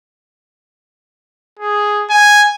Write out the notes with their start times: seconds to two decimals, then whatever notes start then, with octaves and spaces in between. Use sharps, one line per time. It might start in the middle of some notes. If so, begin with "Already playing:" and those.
1.60 G#4
2.10 G#5